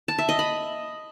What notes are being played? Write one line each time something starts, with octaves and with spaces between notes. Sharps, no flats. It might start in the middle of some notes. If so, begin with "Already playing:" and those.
A5
E5
D#5
B5